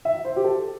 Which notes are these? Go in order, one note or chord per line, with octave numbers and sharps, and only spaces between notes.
E5
C5
G4
A4